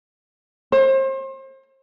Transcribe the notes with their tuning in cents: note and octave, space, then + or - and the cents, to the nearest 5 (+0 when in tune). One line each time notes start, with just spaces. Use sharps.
C5 +35